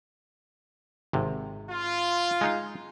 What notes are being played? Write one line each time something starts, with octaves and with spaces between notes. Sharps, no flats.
G#1 C3
F4
G#3 D#4 F5